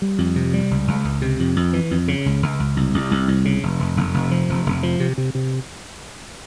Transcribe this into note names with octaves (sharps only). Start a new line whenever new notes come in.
G3
F2
C3
G3
C#2
C#2
C#2
C3
F2
F2
E3
F2
C#3
C#2
C#2
C#2
C2
C2
C2
C2
C#3
F1
F1
F1
F1
F3
F1
F1
F3
C3
C3
C3